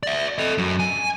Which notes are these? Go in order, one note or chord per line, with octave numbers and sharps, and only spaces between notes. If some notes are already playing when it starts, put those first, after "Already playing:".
D5 E5
A4 D#5
F#2
G#5